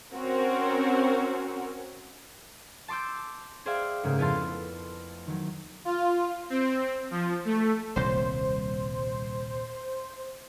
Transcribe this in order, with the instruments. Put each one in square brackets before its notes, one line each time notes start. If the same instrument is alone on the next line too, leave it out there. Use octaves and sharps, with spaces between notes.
[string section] C4 C#4 F#4 A#4
[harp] A5 C6 D6 E6 G6
G#4 C5 D5 E5 F5 G5
G#2 C#3 A3 A#3
F2 B3 E4 F5 A5 C6
D#3 F#3
[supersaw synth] F4
C4
F3
A3
[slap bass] D#1 C2 A#2 [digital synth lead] C5